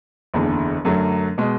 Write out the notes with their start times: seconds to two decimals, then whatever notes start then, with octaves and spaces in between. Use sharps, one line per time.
0.34 F#1 E2 D3
0.85 F#2 D3 F#3 A3
1.38 B2 G#3